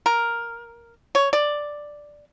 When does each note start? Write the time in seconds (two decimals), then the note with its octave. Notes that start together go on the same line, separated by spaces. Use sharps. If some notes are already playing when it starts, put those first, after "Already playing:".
0.06 A#4
1.15 C#5
1.33 D5